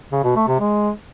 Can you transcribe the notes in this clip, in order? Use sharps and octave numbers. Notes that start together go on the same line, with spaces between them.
C#3
B2
A3
C3
G#3